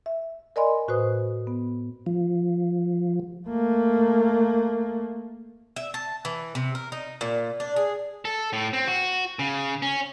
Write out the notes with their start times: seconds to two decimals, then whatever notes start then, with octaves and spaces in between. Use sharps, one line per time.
0.06 E5
0.56 A#4 D5 D#5 G#5 B5 C6
0.88 A2 F#4 B4 C5 D#6
1.47 B3
2.06 F3
3.48 A3 A#3
5.76 E5
5.94 A5
6.25 E3
6.55 C3
6.75 A#4
6.92 D#4
7.21 A#2
7.60 D4
7.76 G#4
8.25 A4
8.53 A2
8.73 C4
8.87 F#4
9.39 C#3
9.82 C#4